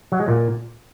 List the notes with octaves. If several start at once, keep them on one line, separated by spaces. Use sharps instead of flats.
F#3
G#3
A#2